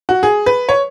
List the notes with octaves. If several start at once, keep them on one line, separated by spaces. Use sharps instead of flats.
F#4
G#4
B4
C#5